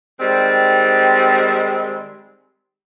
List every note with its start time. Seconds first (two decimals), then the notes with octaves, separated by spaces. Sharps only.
0.20 D#3 G3 G#3 C4